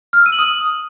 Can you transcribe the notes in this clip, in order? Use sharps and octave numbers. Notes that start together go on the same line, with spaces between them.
F6
E6
D#7
F#7
D#6